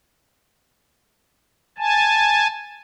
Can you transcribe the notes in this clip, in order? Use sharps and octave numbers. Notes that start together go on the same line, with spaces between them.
G#5 A5